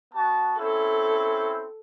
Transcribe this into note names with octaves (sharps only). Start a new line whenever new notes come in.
B3 F#4 A5
C4 C#4 E4 A4